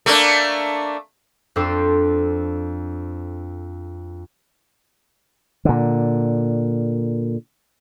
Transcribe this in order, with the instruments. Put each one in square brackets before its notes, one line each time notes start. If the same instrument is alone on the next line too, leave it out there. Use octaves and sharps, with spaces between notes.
[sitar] A3 A#3 D4
[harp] F2 C4 D4 A4 C6
[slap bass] A#2 D3